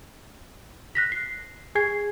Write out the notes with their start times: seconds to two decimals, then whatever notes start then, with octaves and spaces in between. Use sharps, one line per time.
0.95 F#6 A#6 B6
1.12 C7
1.75 G#4 G#5 G#6 C7